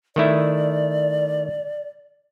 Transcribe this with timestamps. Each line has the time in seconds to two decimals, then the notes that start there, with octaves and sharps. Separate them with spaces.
0.16 D#3 A3 E4 D5